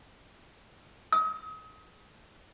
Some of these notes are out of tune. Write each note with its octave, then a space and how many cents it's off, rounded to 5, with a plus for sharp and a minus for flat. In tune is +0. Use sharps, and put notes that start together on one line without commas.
D#6 +35